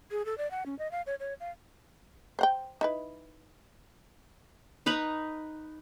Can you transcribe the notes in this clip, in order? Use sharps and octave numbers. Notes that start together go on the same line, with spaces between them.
G#4
A4
D5
F#5
C#4
D#5
F5
C#5
C#5
F5
C5 F#5 G5
D#4 E4 B4
D#4 B4 A#5 B5